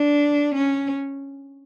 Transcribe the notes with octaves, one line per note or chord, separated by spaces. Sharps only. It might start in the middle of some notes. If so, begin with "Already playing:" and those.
Already playing: D4
C#4